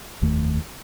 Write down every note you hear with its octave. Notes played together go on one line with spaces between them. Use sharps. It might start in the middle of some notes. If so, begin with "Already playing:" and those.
F1 D#2 D#3 A3